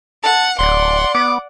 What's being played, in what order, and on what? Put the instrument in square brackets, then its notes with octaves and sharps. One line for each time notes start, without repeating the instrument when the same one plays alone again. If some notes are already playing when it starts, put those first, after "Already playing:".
[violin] F#5 [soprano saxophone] A5
[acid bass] D1 [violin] D5 F#5 [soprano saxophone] C6
[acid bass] B3 [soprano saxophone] D6